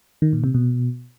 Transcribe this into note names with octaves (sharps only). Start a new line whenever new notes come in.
D#3
A#2
C3
B2